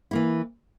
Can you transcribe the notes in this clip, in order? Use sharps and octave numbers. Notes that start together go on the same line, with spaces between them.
E3 A#3 E4